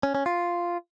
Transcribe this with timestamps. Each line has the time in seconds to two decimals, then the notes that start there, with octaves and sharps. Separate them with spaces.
0.03 C#4
0.15 C#4
0.26 F4